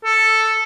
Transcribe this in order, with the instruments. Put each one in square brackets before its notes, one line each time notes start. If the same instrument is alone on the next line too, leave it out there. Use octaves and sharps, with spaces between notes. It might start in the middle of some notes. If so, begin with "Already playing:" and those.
[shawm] A4